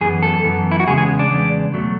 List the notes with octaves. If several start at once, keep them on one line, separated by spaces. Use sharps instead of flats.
F#2 E3 B3 G#4
A4
F#2 E3 B3
E4
F#4
E2 C#3 G#3 B3 G#4
G#4
D4
E2 C#3 G#3 B3
B2 F#3 A3